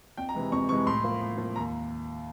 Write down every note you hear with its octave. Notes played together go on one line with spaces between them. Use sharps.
F2 G5
A#5
C3 E3 G#3
F2 C#6
C3 E3 G#3 C#6
A2 C6
F3 A#3
A2
F3 A#3
D#2 A#5